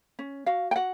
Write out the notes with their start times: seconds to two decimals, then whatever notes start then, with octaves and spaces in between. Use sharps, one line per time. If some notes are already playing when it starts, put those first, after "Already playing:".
0.19 C#4
0.46 F#4 F5
0.71 G5
0.76 F#4 F#5